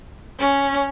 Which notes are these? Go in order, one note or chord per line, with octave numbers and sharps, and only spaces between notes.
C#4